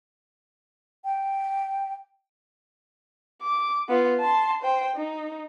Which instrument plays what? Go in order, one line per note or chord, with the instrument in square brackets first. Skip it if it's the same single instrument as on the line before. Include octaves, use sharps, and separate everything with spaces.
[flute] G5
[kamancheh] D6
B3 F4
A5 C6
C5 G5
D#4